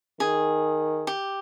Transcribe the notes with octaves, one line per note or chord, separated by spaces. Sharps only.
D#3 G#4
G4